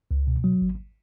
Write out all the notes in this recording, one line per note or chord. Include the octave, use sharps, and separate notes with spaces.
C#2
B2
F#3
G#1